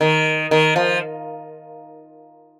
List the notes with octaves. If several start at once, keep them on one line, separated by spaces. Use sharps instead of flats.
D#3
D#3
F3